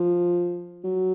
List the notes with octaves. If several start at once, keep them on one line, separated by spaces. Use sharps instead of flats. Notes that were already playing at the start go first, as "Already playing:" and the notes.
Already playing: F3
F#3